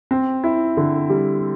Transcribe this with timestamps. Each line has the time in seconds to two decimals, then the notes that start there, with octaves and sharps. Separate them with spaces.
0.11 C4
0.44 E4
0.77 D3
1.09 G3